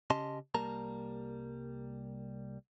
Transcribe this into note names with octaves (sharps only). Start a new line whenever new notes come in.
C#3 C#4 G4 D#5 A5 C6
C2 G3 A#3 A#4 A5 A#5